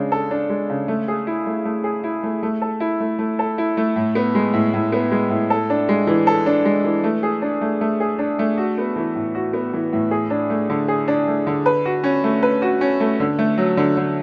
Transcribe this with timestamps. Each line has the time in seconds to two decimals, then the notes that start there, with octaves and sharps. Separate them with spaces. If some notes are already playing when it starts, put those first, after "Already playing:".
Already playing: C#3 G#3 D4
0.12 A4
0.31 D4
0.50 G#3
0.70 C#3
0.88 A3
1.08 G#4
1.27 E4
1.47 A3
1.65 A3
1.84 G#4
2.04 E4
2.23 A3
2.43 A3
2.62 A4
2.80 E4
3.00 A3
3.19 A3
3.39 A4
3.58 E4
3.77 A3
3.96 A2
4.15 B3
4.35 G#3
4.53 A2
4.74 A2
4.92 B3
5.12 G#3
5.30 A2
5.50 A4
5.70 D4
5.89 G#3
6.07 E3
6.27 A4
6.46 D4
6.65 G#3
6.84 E3
7.04 A3
7.23 G#4
7.42 D4
7.61 A3
7.81 A3
8.00 G#4
8.19 D4
8.39 A3
8.58 F#4
8.78 B3
8.96 E3
9.15 A2
9.35 F#4
9.53 B3
9.73 E3
9.93 A2
10.11 G#4
10.30 D4
10.50 A3
10.70 D3
10.88 G#4
11.08 D4
11.28 A3
11.47 D3
11.66 B4
11.86 F#4
12.04 C#4
12.24 A3
12.43 B4
12.62 F#4
12.81 C#4
13.00 A3
13.20 D3
13.39 A3
13.57 F#3
13.77 D3
13.97 D3